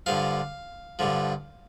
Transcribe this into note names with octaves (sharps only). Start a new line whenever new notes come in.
G2 D3 F3 F5
G2 D3 F3